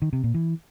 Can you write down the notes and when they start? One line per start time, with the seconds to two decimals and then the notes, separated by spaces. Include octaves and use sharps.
0.02 D#3
0.13 C3
0.24 A#2
0.34 E3